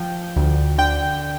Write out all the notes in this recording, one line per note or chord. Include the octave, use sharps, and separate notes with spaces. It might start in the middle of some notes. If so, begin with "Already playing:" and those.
Already playing: F3 G5
D2
D3 G5